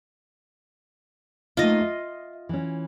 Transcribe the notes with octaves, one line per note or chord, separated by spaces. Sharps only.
A3 A#3 D#4 F4 D#5
E5
E3 C#4